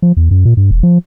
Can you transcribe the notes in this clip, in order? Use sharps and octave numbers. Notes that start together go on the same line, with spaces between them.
F3
E2
F#2
A#2
G2
E1
F3